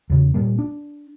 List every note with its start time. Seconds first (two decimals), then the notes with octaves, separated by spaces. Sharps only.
0.10 E2 C#3
0.34 A#2 G3 A#3
0.59 D4